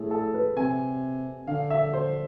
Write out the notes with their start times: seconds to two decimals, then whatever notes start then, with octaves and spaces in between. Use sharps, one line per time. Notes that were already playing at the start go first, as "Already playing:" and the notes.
Already playing: A2 G#4 A4
0.11 A4
0.34 B4
0.57 C3 G#5
1.47 D3 F5
1.70 E5
1.93 C5